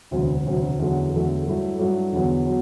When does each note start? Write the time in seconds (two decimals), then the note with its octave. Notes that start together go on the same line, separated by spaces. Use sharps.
0.11 E1 D2 C3 F#3
0.44 E1 D2 C3 F#3
0.78 E2 D3 F#3 A3
1.12 E2 D3 F#3 A3
1.45 G2 F#3 A3 E4
1.79 G2 F#3 A3 E4
2.13 E2 D3 F#3 B3
2.46 F#3 B3